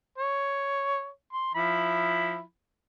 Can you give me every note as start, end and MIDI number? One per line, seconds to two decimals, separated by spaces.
0.18 1.09 73
1.33 1.50 84
1.54 2.41 53
1.54 2.41 64
1.54 2.41 83